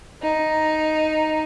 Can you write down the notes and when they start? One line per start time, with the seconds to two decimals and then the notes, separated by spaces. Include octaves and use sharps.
0.22 D#4